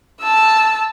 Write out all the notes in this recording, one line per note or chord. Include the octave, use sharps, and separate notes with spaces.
A5 E6